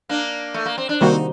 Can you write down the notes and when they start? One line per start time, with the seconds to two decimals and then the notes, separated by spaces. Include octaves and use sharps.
0.09 A#3 D4
0.54 A3
0.66 A#3
0.78 C4
0.89 D4
1.01 C3 D#3 G3 A#3 C4 D#4 F#4